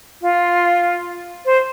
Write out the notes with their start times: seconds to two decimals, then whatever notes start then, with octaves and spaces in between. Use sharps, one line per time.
0.22 F4
1.46 C5